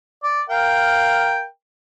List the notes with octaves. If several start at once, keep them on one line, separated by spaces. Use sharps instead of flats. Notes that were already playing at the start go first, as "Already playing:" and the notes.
D5
A#4 F5 G5